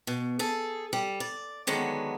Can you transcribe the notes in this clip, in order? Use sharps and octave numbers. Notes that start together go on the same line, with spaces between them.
B2
G#4 A4
G3
D5
D3 D#3 F#3 G#3 B3